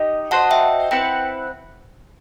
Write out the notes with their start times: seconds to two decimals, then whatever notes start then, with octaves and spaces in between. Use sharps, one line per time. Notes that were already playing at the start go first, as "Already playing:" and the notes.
Already playing: D#4 G4 D#5
0.31 F#4 C5 D#5 F#5 A5
0.51 E5 G5
0.91 C4 E4 B4 F#5 G5